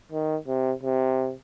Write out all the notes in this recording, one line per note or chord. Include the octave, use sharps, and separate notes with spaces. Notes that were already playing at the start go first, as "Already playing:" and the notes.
D#3
C3
C3